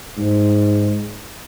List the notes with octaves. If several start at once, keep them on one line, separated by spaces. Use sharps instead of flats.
G#2